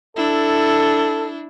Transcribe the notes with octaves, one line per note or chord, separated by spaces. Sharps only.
D4 E4 A4